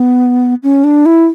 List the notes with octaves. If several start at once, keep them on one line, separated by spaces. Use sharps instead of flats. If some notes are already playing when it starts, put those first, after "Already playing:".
Already playing: B3
C#4
D4
E4